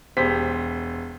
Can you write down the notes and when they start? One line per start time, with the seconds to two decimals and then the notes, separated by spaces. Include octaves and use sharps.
0.17 E1 G4 C5 B6